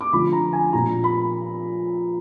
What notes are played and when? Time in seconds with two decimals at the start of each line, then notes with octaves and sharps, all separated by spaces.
0.01 D6
0.13 D3 F3 B5
0.33 A#5
0.53 G#5
0.73 A#2 F3 A#5
1.04 B5